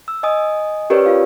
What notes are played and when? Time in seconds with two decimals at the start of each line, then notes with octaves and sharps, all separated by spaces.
0.08 E6
0.23 D#5 G#5 D#6
0.90 C#4 G4 A#4 B4 C#5 D5
1.06 F4 F5